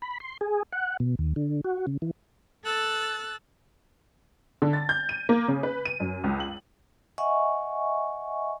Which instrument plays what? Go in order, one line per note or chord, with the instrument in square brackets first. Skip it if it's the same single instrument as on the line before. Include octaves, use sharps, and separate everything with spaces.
[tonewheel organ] B5
C6
G#4
F#5
B2
D#2
D3
F#4
C#3
E3
[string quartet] A4 E6 F#6 A6
[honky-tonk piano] D3
A6
G6
D#7
A#3
C#3
B4
D#7
F#2
C#2
F#7
[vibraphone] D#5 E5 F#5 G#5 C#6